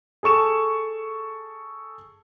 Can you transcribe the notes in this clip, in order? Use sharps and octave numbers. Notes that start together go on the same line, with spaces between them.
G#4 A4 C#6 E7